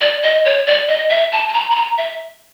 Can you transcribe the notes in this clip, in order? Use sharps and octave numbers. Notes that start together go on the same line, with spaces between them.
D5
D#5
C#5
D5
D#5
E5
A5
A5
A#5
B5
A#5
E5